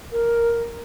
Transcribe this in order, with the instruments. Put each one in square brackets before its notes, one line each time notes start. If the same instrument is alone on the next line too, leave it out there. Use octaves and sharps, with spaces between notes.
[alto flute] A#4